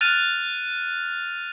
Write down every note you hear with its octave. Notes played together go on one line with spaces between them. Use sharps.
F6 F#6 A6 D#7 F7